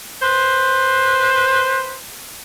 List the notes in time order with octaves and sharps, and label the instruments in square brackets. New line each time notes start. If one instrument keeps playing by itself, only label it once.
[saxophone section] B4 C5